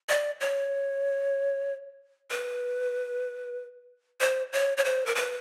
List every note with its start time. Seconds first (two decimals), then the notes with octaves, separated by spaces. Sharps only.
0.09 D5
0.41 C#5
2.31 B4
4.21 C5
4.53 C#5
4.77 C#5
4.85 C5
5.06 A#4
5.15 B4